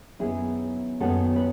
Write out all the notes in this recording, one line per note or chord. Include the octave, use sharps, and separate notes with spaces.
F#2 D#3 F#3 B3 E4 G#4
F#2 D#3 F#3 B3 F#4 A4
B4